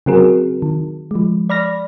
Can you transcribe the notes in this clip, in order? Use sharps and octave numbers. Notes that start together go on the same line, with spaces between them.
C#3 F#3 C4 F#4 G#4 A#4
D#3
F3 G#3
D5 B5 F6 A#6